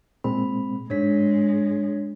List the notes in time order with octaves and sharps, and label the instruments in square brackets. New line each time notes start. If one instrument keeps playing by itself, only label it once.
[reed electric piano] A#2 G#3 C4 [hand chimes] B5
[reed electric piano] G#2 [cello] G#3 [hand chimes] D4 C#5 B6